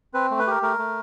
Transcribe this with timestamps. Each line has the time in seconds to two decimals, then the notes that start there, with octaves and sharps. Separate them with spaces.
0.14 C4 B4
0.31 A3
0.39 B4
0.47 G4 A#4
0.62 A3 A#4
0.79 A3